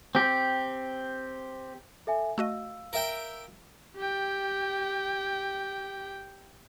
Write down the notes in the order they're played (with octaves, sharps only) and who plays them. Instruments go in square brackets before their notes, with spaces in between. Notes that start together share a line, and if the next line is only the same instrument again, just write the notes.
[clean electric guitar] C4 G4
[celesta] A4 E5 G#5
[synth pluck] A3 F#4 D#5 [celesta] F5 E6
[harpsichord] A#4 E5 G5
[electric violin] G4 G5